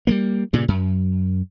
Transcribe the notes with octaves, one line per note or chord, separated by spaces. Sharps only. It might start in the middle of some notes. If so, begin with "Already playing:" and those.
G3 G#3 A#3
G2 A#2 C#3
F#2